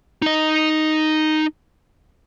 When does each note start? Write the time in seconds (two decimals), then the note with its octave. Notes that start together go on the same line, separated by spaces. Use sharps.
0.22 D#4 D#5